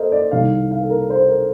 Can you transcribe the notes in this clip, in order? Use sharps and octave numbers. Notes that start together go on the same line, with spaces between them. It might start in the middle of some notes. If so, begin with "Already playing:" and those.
Already playing: A4 A#4 C5 D#5
D5
C2 C3 D#3 G3 F5
F5
A4
A#4
C5
A#4